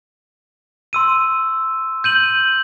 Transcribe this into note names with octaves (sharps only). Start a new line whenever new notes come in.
C6 E6 D#7
G6 D#7 F#7